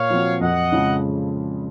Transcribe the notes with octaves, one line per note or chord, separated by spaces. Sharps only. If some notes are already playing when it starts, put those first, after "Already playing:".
Already playing: A#2 C#5 F5
F3 C4 F#4
F2 D#5 F#5
C#3 F3 G#3